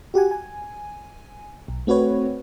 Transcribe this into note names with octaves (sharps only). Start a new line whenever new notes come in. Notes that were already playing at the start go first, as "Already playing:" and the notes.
F#4 G4 F#5 G#5
G#5
B1
A3 C4 F#4 B4 C#5